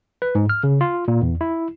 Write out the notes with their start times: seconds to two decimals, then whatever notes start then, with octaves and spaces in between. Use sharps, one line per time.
0.22 B4
0.35 G#2
0.50 F6
0.64 C#3
0.81 F4
1.08 A#2
1.22 E2
1.41 E4